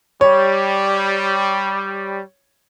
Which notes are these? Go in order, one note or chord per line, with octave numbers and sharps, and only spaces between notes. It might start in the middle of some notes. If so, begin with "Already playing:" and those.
G3 C#5